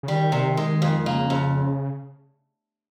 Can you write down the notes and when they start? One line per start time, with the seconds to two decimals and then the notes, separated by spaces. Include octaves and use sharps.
0.03 C#3
0.08 D#3 G3
0.32 C3
0.57 G#3
0.82 F2
1.06 C#3 A#3
1.30 F2